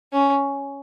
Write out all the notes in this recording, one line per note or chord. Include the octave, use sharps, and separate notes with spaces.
C#4